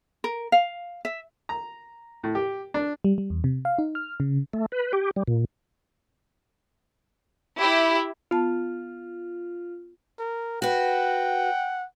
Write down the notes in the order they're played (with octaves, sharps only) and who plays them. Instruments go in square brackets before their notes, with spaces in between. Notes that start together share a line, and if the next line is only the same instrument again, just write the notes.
[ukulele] A#4
F5
E5
[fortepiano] A#5
A2
G4
D4
[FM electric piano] G3
G3
E2
C3
F5
D#4
F6
C#3
[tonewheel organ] A3
B4
G4
G3
A#2
[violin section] E4 G4
[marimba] B3 A5 [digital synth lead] F4
[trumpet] A#4
[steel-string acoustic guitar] F#4 B4 [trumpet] F#5 [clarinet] G5